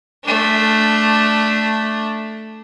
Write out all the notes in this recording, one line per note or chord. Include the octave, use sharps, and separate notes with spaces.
A3 D4